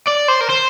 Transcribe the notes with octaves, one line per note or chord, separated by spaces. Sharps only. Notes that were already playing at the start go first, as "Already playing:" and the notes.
D5
C5
A#4
C5